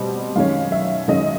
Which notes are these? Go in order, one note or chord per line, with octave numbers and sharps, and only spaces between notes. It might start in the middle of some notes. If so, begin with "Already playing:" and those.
Already playing: B2 G3 C4
F#2 D#3 G#3 C#4 F5
E5
F#2 D#3 G#3 C#4 D#5